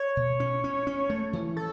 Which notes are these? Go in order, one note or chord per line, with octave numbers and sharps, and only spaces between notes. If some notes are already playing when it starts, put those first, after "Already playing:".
Already playing: C#5
B2
C#4
C#4
C#4
A3
E3
A4